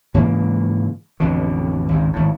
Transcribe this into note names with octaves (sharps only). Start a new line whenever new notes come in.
G#2 C#3 E3 A#3
A1 F2 B2 D3
G#1 C#2 G#2
G#1 A2